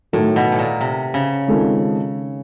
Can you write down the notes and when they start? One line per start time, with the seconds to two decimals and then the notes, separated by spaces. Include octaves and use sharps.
0.13 A2 D#3 F#3 A3
0.36 B2
0.52 A2
0.59 A#2
0.81 C3
1.14 C#3
1.48 D#3 G#3 C4 F4 A4